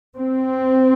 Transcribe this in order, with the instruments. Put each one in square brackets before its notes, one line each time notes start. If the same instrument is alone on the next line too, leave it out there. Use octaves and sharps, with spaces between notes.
[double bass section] C4